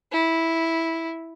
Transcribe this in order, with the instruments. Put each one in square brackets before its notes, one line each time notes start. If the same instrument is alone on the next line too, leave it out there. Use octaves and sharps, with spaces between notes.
[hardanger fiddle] E4